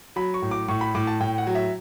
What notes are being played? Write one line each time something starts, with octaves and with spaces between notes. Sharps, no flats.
F#3 B5
C#6
A2
D6
A2 C#6
B5
A2 D6
A5
A2 G5
F#5
F#3
E5